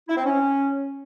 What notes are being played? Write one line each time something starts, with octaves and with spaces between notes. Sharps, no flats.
E4
C4
C#4